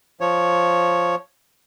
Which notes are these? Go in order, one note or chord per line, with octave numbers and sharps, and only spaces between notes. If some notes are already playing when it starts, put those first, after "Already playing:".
F3 C#5